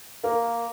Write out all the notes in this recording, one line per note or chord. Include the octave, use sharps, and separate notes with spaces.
A#3 A#4